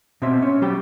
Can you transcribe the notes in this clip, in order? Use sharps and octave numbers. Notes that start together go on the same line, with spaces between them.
B2 C4 E5
C#4
F#3 G4 G5